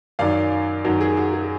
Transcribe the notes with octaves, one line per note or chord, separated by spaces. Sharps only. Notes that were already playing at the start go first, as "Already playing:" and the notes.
F#2 D#3 F#3 D5 F5
F#2 D#3 F#3 F#4
G#4
F#4
G#4